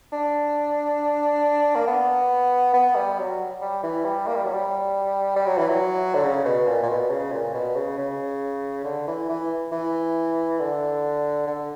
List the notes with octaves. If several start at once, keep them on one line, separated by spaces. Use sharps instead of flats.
D4
A#3
B3
B3
G3
F#3
G3
E3
G3
A#3
G3
F#3
G3
G3
F#3
E3
F#3
D3
C#3
B2
A#2
A#2
B2
C#3
A#2
B2
C#3
C#3
D3
E3
E3
E3
D3
D3